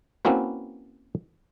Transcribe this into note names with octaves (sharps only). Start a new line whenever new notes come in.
A#3 C4 C#4 E4 F#4 B4